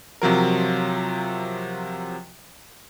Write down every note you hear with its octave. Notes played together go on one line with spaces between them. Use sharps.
C3 F3 F#3 A#4